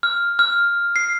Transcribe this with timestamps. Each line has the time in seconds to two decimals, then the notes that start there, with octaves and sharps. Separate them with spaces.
0.03 F6
0.39 F6
0.96 C7